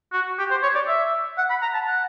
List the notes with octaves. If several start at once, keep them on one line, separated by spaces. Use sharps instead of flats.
F#4
G4
C5
C#5
D5
E5
F#5
B5
A#5
A5
F#5